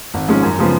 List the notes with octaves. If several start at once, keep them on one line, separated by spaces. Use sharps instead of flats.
G#1
G#2 F3 G#3 C#4
F#2
C#3 F3 G#3 B3